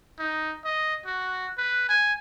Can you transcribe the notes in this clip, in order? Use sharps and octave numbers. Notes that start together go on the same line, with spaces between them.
D#4
D#5
F#4
B4
G#5